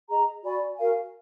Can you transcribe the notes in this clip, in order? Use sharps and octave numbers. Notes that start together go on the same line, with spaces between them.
G#4 D#5 A#5
F#4 D5 G#5 B5
F#4 A#4 F5 G#5